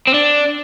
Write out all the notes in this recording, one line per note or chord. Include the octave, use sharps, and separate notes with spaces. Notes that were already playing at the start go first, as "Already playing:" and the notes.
C4
D4